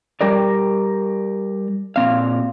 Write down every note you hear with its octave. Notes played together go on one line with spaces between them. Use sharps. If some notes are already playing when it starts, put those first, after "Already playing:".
G3 G4 A#4 D5
A#2 C4 F5